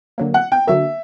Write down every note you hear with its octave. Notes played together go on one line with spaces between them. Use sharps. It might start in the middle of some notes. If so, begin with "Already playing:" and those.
D3 F#3 A#3
F#5
G5
D3 F#3 A#3 E5